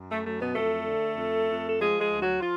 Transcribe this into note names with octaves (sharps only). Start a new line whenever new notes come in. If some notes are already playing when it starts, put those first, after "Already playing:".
Already playing: F#2
A3
F#3 A3
B2 B3
F2 A3 A4
D3
F2
F2
A4
F3 G#3 G#4
G#3 G#4
D2
F#3 F#4
F3 F4